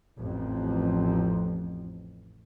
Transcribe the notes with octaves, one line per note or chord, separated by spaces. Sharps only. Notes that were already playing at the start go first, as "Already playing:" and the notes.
A1 F2